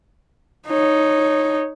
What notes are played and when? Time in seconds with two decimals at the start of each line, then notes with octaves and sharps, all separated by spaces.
0.68 D#4 C#5